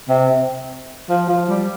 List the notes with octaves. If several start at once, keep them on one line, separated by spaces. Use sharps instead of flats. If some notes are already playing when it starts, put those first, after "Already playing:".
C3
F3
F3
G3